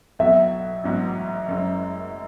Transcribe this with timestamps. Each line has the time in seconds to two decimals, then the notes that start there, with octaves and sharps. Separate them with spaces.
0.19 B1 B2 F#3 B3 E5
0.84 A1 G#2 F#3 B3 F#4
1.48 F#1 F#2 C#3 G#3 C#4